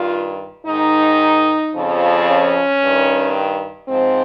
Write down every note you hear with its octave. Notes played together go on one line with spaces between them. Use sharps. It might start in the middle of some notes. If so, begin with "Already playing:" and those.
Already playing: G2 D#3 F4
G#2 D#3 D#4
F2 C#3 F3
C#4
G2 D#3
G#2 F3 C4